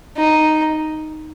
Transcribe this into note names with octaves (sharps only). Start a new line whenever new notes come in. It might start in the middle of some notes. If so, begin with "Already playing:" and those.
D#4